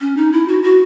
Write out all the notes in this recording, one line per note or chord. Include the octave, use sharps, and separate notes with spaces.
C#4
D#4
E4
F#4
F#4